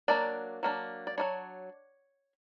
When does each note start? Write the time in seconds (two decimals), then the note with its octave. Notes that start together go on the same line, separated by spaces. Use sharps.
0.08 F#3 A#3 D4 D5
0.63 F#3 A#3 D4
1.07 D5
1.18 F#3 A#3 D4 C#5